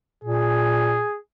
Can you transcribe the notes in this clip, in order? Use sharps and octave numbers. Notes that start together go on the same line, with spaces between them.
A#2 G#4